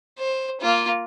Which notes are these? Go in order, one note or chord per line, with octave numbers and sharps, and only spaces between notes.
C5
A#3 F4